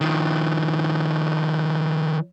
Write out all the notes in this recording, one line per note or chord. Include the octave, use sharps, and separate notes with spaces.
D#3 F3